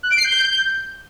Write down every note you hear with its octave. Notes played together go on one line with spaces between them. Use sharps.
F#6
D7
C7
G6